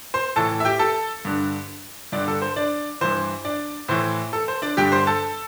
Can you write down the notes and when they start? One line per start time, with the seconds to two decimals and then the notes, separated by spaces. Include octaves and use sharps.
0.14 C5 C6
0.36 A2 E3 A4 A5
0.60 E5
0.65 G4 G5
0.79 A4 A5
1.25 G2 D3
2.12 G2 D3 D4 D5
2.28 A4
2.42 C5
2.56 D4 D5
3.01 G2 E3 C5
3.45 D4 D5
3.88 A2 E3 C5
4.33 A4
4.48 C5
4.62 D4 D5
4.77 G2 D3 G4 G5
4.92 C5 C6
5.07 A4 A5